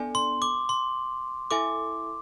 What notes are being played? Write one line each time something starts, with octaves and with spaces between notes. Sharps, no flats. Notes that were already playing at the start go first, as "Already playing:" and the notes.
Already playing: B3 D4 A4 D5 G#5
C6
D6
C6
E4 A4 E5 G#5 D6